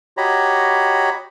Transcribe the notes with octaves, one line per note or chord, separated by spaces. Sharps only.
F#4 G4 C#5 D#5 A#5 B5